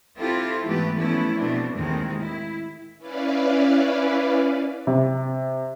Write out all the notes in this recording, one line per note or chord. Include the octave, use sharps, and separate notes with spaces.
C4 E4 F4 G4 A4
G#2 E3 A3 B3 G4 B4
E3 F3 A3 B3 C#4 E4
B2 A3 C4 D4
D#2 A2 D#3 G#3 C4
E4
C#4 E4 B4 D5 F5
C3